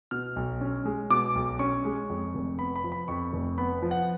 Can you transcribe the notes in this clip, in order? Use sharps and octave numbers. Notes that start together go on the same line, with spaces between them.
B2 F6
B1
C#4
G#3
B2 D6
B1
C#4 C#6
G#3
F2
F1
B3 B5
B5
F3
B5
F2 C#6
F1
B3 B5
F3
F#5